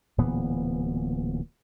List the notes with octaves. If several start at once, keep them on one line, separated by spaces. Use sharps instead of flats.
D1 A#2 E3 B3